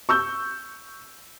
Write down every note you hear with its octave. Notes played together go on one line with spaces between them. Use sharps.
C#6 E6 G6